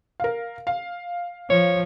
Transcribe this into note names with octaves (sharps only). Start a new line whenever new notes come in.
A#4 F5
F5
F3 C#5